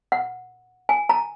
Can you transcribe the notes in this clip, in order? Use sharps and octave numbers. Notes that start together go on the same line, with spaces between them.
F#5
G#5
A#5